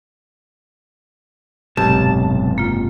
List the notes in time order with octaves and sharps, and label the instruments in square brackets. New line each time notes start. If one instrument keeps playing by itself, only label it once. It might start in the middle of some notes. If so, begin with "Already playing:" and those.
[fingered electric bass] F#1 G#2 C3 [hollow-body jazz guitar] B1 [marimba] G4 [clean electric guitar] A5
[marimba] A#3 F4